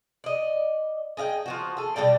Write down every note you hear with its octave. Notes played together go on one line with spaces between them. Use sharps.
D5 D#5
G#4 D#5 F5 G5
F3 B3 F#4
G#4 A4
B2 G3 D5 G5